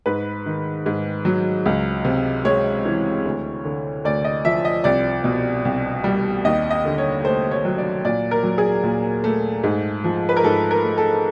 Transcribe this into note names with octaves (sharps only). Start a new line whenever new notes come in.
G#2 B4
D#3
G#2
F#3
C#2
C3
G#3 C#5
E3
D2
D3
D2 D5
D#5
F3 E5
D#5
C2 D5
B2
C2
G3
D#2 D#5
D#5
D3
C#5
A3 C5
C#5
F#3
D5
A#2 D5
A#4
F#3
G#4
A#2
A3
G#2
F3
B4
A#4
G#2 A4
A#4
A3
A4